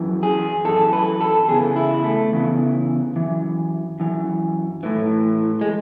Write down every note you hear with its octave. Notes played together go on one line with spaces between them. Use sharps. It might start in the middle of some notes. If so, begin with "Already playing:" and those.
Already playing: F#2 E3
G#4
F#2 E3 A4
B4
A4
E2 C#3 E3 G#4
E4
A3
E2 C#3 E3
F#2 E3
F#2 E3
A2 E3
G#3